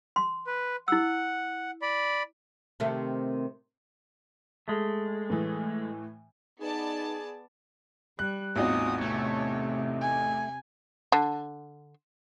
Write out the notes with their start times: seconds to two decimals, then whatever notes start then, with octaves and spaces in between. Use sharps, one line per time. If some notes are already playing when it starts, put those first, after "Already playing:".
0.16 C6
0.47 B4
0.88 E4 F#5 E6
1.82 D5 B5
2.80 C3 D#3 A3
4.68 G#3 A3
5.30 A2 E3
6.60 B3 D#4 G#4 D5 A5
8.19 G3 F#6
8.56 A1 E2 C4 D#4 F4 F#4 D#6
9.01 C3 A3 C#5
10.01 G#5
11.12 D3